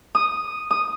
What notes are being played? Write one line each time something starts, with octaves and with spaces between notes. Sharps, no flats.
D#6
D#6